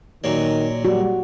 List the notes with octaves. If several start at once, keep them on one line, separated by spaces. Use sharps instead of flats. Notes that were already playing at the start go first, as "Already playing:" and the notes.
A#2 D#3 F#3
G3 F#4